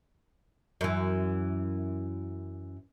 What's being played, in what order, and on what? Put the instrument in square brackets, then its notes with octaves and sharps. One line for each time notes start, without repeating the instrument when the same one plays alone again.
[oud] F#2 E3